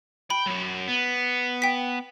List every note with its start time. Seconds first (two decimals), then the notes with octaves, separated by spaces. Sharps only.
0.30 G5 B5
0.46 F#3 C#4
0.87 B3
1.62 G5 B6